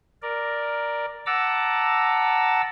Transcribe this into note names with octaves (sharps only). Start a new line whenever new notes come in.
A#4 D5
F#5 A5 A#5 D6 E6